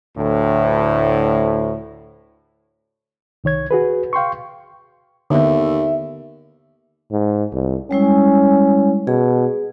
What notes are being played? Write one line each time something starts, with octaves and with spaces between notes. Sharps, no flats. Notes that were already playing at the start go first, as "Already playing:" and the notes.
D2 A2
C2 D#3 C#5 G#6
F#4 G#4 B4
F5 G5 C6 C#6
D#2 D3 B3 E5
G#2
C2
G3 G#3 C#4 E4
B2 G#4